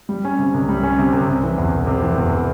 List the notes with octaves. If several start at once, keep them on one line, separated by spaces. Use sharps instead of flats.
G3
C#4
C3
C2
G3
C#4
C3
C2
C3
E3
E2
E1
C3
E3
E2